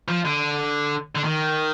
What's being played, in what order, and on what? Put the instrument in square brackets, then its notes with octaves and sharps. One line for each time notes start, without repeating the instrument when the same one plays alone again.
[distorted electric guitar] F3
D3
D3
D#3